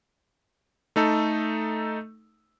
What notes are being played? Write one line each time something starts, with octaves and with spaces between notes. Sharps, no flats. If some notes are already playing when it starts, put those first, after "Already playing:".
A3 D#4 A4